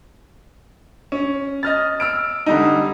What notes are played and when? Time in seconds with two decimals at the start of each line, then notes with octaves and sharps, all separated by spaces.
1.12 C#4
1.63 D#5 F6 A6
2.00 E6 F6 D7
2.46 D3 G3 D#4